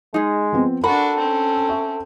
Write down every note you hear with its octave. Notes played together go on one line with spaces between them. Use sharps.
G#3 D#4 G#4
F3 B3 C4
D4 F#4 A4 A#4 A#5 B5 C#6
C4 C#4
E5 C#6